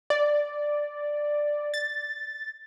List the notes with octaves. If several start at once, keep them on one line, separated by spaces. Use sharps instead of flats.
D5
A6